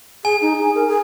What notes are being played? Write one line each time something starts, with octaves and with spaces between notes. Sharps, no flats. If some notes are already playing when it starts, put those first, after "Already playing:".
G#4 G#5
D#4
G#4
A#4
G#4